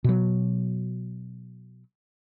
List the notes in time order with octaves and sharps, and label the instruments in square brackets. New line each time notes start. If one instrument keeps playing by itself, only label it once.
[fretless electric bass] B2 F#3